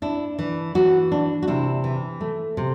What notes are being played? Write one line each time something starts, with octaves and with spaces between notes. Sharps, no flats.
D4 E4
E3
E3 F#4
D4
F#4
C3 E4
E3
A3
C3